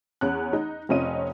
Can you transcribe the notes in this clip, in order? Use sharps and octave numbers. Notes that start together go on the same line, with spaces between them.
E2 C#4 F#6
D#4
F1 C4 C#4 F4 D#5 D#7